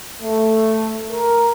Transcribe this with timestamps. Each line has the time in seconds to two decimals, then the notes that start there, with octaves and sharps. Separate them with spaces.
0.22 A3
1.10 A#4